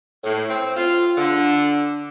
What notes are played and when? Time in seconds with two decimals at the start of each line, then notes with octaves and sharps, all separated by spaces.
0.24 A2
0.50 C4
0.77 F4
1.18 D3